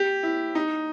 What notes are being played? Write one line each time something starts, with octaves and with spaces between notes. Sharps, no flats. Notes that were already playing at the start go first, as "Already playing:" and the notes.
Already playing: G4
E4
D#4